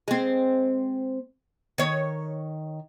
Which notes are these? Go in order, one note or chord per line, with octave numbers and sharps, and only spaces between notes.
G#3 C4
D#3 C#5